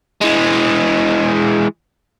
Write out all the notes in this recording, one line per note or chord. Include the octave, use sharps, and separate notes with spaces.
E3 G#3